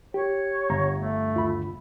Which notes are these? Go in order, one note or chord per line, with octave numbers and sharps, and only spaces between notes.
G4 C#5
G1 A#5
A3
D#2 F4 B5